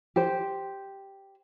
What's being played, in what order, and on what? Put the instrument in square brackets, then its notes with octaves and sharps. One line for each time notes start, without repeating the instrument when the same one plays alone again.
[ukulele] G4 C5